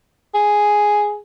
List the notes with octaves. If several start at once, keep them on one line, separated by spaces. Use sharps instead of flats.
G#4